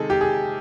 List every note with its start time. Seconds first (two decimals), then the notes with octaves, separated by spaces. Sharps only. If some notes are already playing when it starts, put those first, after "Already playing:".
Already playing: C3 D#3 G#3 G#4 A4
0.10 G4
0.21 G#4